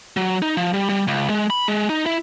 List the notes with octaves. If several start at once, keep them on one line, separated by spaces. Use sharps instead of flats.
F#3
D#4
F3
G3
G3
C#2
G#3
B5
G#3
D#4
E4